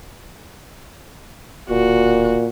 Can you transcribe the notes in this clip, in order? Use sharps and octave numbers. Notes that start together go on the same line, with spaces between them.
D1 A#2 F#4